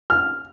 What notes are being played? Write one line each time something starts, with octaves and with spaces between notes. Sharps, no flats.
F6